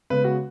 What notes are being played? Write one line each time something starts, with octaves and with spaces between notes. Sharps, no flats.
C#3 G#3 B3 B4
F#4